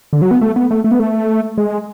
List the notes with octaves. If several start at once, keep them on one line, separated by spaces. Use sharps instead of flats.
D3
F#3
B3
A3
B3
A3
A3
B3
A3
G#3